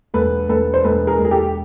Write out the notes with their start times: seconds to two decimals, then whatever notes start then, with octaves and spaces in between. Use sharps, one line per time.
0.14 E1 A4 B4
0.49 E1 A4 B4
0.74 C5
0.84 E1 A4 B4
1.07 G#4 A#4
1.19 E1
1.25 G#4
1.31 G4 A4